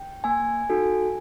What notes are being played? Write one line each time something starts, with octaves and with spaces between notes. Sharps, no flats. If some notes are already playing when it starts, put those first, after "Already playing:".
Already playing: G5
A#3 G#5
D#4 F#4 A4